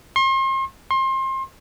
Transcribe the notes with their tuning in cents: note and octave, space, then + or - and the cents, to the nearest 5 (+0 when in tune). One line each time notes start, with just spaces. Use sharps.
C6 +40
C6 +30